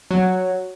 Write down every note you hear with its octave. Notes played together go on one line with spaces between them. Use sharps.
F#3